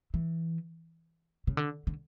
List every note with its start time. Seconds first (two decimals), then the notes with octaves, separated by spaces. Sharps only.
0.14 E3
1.47 C#3
1.57 D3
1.87 D3